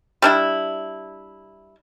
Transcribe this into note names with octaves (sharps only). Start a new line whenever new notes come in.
G3 D4 E4